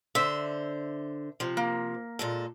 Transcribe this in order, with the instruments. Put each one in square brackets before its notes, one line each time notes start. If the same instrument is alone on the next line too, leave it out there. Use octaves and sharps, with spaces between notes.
[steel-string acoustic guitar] D3 C5 [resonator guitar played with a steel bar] E5
[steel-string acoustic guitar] C3 F3
[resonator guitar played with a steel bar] A#3
[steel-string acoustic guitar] A#2 G#3 A4